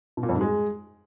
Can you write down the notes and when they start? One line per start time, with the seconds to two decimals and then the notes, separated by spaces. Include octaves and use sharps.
0.17 B2
0.23 A#2
0.29 F2
0.35 G#2
0.41 G#3